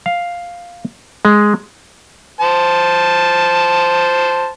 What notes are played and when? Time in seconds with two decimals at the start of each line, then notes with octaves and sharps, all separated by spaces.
0.06 F5
1.25 G#3
2.41 C5 A5